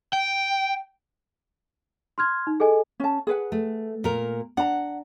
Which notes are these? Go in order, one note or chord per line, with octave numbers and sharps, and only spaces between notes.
G5
C6 F6 G#6
D#4
G#4 A4 D#5 G#5
C#4 A5
G#4 B4 F#5
A3
A#2 A#4
D4 F#5 A#5